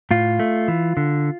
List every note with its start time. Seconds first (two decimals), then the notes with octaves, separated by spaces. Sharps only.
0.11 A2 F4
0.39 A3
0.68 E3
0.97 D3